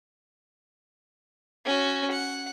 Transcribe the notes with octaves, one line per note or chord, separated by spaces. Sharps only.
C#4 F#4
F#5